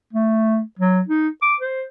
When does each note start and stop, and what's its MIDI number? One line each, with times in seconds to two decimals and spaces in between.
0.13 0.60 57
0.79 1.01 54
1.08 1.29 63
1.42 1.55 86
1.60 1.84 72